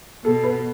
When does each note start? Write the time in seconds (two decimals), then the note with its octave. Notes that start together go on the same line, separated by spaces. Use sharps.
0.25 B2 A4
0.44 B4